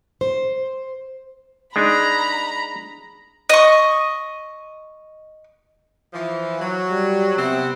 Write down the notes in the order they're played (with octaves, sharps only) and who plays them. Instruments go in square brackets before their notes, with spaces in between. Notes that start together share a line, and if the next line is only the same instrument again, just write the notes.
[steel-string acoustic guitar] C5
[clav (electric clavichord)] G#3 D4 D#4 [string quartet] A#5 B5
[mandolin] D#5 C#6
[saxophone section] E3 F3
F#3
[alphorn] G3
[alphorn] C3 [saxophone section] B3 C4